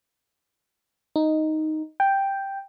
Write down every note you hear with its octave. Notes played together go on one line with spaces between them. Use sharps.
D#4
G5